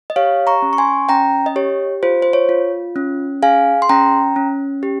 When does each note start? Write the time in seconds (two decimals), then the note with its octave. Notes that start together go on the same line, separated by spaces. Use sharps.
0.10 D#5
0.16 G4 C#5 F5
0.47 A#5 C#6
0.62 C#4
0.73 C#6
0.78 G#5 C6
1.09 C#4 G5 A#5
1.46 D#5
1.56 G4 C#5
2.03 F4 C5
2.22 C5
2.33 C#5
2.49 F4
2.96 C#4
3.42 G#4 F5 G#5
3.82 C6
3.89 C#4 G5 A#5
4.36 C#4
4.83 G4